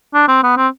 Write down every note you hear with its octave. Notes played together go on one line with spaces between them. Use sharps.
D4
C4
B3
C4